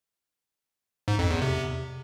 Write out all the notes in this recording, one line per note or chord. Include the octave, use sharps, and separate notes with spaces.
G#2
F2
E2
C3